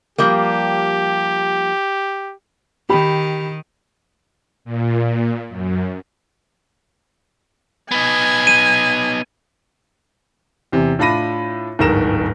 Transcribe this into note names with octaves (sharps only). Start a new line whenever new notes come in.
F3 G3 A#3 G4
D#3 G4 B5
A#2
F#2
B3 D#4 G#5
D#7
E2 C3
A2 D4 F4 B5 A#6 D#7
D1 G1 G#2 A#4 A#6 E7